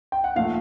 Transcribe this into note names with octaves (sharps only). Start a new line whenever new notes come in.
G5
F#5
A#2 F3 A3 F5